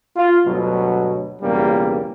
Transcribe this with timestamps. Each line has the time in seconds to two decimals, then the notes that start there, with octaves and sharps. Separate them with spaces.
0.16 F4
0.46 D2 G2 B2 F#3
1.41 B1 E2 G2 C#3 G3 A#3